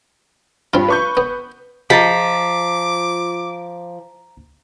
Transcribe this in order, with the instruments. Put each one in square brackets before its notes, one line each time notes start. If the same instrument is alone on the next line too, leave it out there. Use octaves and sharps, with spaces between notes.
[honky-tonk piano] G2 [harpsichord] C4 F4
[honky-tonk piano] B4 C#6 G6
[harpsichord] B3
[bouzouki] F3 [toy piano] F4 G#4 D#5 [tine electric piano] A#5 A6 B6 [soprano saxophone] D6